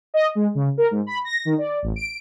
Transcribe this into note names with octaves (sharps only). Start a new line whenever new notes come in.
D#5
G#3
C#3
A#4
G#2
B5
A#6
D#3
D5
A1
D7